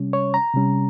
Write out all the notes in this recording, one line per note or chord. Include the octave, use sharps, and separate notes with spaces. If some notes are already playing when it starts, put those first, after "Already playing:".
Already playing: C3 G3 C#4
C#5
A#5
C3 G3 C#4